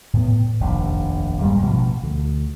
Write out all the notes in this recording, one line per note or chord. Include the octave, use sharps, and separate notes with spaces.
A2 B3
F1 A#1 D#2
G2 A#2 G3 G#3
A1 B2 F3
D2